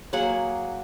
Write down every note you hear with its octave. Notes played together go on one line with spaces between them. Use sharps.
F#3 A#3 G#4 F#5